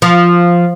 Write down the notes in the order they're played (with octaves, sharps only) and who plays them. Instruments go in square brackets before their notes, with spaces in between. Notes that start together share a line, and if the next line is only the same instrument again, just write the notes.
[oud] F3